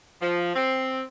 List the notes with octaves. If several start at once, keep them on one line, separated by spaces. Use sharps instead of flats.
F3
C4